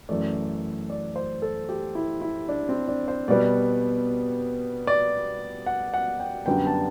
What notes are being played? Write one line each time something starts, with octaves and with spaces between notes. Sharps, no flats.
F#2 E3 A3 D5
D5
C5
A4
G4
E4
E4
D4
C4
D4
C5
B2 G3 B3 D5
D5
F#5
F#5
G5
F#2 D3 G3 B3 G5
A5